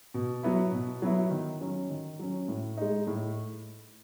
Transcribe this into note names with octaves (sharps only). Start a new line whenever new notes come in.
B2
F#3 B3 E4
B2
F#3 B3 E4
D#3
F#3 C#4
D#3
F#3 C#4
A2
G#3 D#4
A2